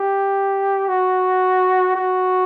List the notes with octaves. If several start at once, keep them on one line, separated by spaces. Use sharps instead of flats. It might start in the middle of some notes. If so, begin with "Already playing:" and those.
Already playing: G4
F#4
F#4